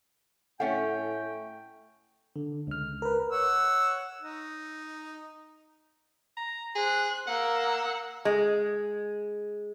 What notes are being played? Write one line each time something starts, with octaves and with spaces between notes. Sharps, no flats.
A2 A3 C#4 F#5 G5
D3
C#2 F6
A#4 B4
C#5 F#5 E6
D#4
A#5
G#4 C5 F#6
A#3 F#5 E6
G#3